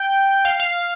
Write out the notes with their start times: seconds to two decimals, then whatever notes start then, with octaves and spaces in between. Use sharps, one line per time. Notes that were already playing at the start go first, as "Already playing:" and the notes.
Already playing: G5
0.45 F5
0.60 F5